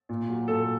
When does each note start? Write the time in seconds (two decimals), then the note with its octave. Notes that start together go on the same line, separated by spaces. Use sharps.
0.09 A#2
0.29 F#3
0.48 A#2 A4